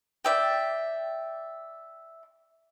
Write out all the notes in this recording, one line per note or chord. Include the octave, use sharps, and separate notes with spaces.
D5 E5 G5